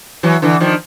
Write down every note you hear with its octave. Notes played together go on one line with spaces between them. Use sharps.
E3 F#3
D3 E3
D#3 F3